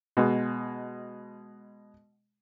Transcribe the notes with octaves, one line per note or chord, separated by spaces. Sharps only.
B2 G#3